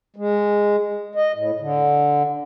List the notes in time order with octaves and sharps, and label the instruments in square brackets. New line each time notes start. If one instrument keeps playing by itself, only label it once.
[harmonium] G#3
D#5
A2
D3